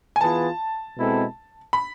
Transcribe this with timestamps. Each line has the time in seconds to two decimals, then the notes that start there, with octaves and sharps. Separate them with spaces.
0.16 G#5
0.21 E3 B3 F4 G#4 B4 A5
0.97 B2 G#3 C4 E4 A4
1.73 B5